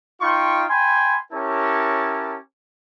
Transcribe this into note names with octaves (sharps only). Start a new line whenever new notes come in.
D#4 F4 G5 C6 C#6
G5 G#5 B5 C6
C#4 E4 G4 A#4 C#5 A5